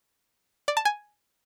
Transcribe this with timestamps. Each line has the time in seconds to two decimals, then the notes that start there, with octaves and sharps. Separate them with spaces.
0.68 D5
0.77 A5
0.85 G#5